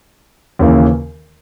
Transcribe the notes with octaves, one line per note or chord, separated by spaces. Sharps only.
D#2 C#3 E3 A#3